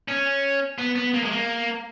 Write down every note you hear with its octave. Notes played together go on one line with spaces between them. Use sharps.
C#4
B3
B3
A#3
G#3
A#3